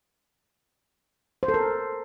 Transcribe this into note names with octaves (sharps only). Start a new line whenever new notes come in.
C5
A4
A#4